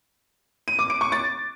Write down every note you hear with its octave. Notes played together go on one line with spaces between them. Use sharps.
D#7
D6
D7
C#6
A6